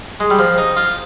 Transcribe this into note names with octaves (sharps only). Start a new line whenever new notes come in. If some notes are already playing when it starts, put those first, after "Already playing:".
G#3
G3
F3
D#4
F4